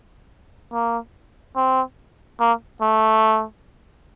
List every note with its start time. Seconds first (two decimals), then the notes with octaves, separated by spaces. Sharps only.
0.73 A#3
1.56 C4
2.40 A#3
2.82 A3